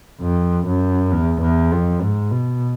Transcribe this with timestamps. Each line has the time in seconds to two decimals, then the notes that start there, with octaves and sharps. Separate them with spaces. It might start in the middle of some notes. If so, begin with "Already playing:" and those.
0.21 F2
0.66 F#2
1.12 E2
1.41 E2
1.72 F2
2.02 G#2
2.31 B2